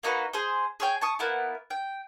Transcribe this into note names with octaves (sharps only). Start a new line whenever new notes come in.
A#3 D#4 F#4 B4
G#4 C5
G#4 C#5 G5
A5 C#6 D#6
A#3 B3 E4
G5